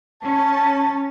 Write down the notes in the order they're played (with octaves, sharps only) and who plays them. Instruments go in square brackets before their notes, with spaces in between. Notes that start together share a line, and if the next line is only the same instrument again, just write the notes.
[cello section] C#4 [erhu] A5